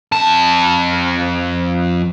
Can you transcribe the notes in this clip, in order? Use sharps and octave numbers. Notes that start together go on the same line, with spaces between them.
F2 A5